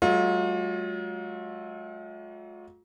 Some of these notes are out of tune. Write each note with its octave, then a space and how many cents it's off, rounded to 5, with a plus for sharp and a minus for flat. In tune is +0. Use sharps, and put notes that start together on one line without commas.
F#3 +35 A3 -45 F4 +40